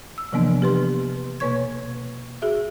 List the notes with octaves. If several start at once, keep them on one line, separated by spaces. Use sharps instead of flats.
E6
C3 E3 F3 A#3 B3 D4
G4 B4 C6
B2 A#3 B4 C#5 C#6 G#6
F#4 G#4 E5